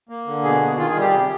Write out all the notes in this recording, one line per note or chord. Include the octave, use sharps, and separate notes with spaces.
A#3
D3
B2 G#4
B2
D#3 F4
G#4
G3
G4
C3